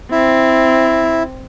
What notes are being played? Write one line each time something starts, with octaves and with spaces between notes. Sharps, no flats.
C4 E4